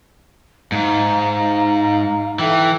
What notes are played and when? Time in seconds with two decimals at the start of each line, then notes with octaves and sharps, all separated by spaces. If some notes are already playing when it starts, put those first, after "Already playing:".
0.72 G#2 F5 A#5
2.39 E3 A4 E5 G5